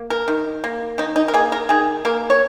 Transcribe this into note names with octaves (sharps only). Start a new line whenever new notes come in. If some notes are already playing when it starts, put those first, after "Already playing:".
Already playing: A#3
A#4
D#3
A#3
D#3 D#4
D#4
A#4
A#3 G#4
A#4
D#3 G#4
A#3 A#4
C#5